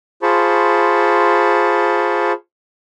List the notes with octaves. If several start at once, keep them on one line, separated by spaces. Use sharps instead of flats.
F4 G#4 C5 A5 B5 C#6